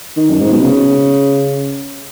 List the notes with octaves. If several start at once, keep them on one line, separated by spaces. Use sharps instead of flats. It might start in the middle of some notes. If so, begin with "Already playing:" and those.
D#3
F#2
G#2
B2
C#3